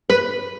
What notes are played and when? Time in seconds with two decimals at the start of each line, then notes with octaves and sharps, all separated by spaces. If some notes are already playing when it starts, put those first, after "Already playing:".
0.10 B4